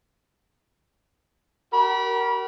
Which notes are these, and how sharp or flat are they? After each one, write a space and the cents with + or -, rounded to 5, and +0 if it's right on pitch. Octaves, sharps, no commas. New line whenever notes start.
F#4 +45 A#4 +0 B5 -25